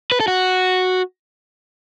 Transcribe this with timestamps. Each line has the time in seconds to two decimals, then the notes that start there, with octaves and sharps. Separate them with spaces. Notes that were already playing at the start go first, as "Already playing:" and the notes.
0.12 B4
0.20 A4
0.28 F#4